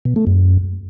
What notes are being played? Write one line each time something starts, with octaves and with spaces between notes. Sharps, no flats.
B2
A3
F#2